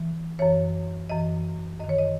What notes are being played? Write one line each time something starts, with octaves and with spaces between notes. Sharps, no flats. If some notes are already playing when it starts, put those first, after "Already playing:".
Already playing: E3
F#2 E3 C#5
F#2 E3 D#5
F#2 D#3 D#5
C#5
D#5